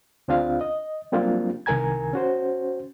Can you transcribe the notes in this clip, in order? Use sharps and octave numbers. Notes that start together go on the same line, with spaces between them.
D2 C4 D4 F4 F5
D#5
F#3 G3 A#3 C4 D4 F4
C2 D#3 A#4 G#5 A#5 G#6
C#4 F#4 C5